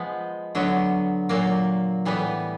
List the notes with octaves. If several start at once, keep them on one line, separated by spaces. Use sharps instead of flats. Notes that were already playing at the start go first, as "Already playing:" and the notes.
Already playing: F3 G#3 B3
D3 F#3 B3
A#2 F#3 A#3
A2 E3 G3 B3